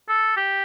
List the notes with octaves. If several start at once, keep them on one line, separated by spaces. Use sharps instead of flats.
A4
G4